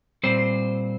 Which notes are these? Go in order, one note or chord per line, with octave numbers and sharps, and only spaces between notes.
A#2 G3 C4 C5